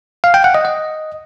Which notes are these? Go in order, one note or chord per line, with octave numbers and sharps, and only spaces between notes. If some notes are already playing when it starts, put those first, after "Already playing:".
F5
G5
F#5
D#5
D#5